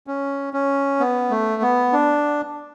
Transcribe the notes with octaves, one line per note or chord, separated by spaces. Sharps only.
C#4
C#4
B3
A3
B3
D4